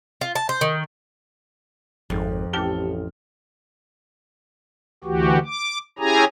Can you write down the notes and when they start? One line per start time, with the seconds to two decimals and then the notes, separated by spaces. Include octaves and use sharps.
0.21 F4
0.35 A5
0.49 C5
0.61 D#3
2.10 G#1 F2 G#2
2.53 A1 G4 A4 F6 G7
5.04 D2 E3 F#4 G4
5.46 D6
5.99 C#4 E4 G4 G#4 G#5 A#5